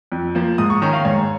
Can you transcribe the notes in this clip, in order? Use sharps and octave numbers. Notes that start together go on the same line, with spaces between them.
F2
F3 A#3
G#2 D#6
C#6
D#3 C#4 A#5
F5
G#2 C#5